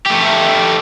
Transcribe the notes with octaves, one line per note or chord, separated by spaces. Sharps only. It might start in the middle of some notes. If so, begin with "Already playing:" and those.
A3 G4